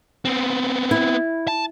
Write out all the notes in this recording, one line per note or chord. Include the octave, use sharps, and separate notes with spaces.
B3 C4
E4
A5